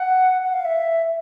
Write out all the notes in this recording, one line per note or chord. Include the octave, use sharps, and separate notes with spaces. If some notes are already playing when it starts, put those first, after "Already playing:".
Already playing: F#5
F#5
F5
E5